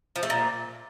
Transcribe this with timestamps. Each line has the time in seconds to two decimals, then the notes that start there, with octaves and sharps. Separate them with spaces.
0.16 F3
0.23 A3
0.30 A#2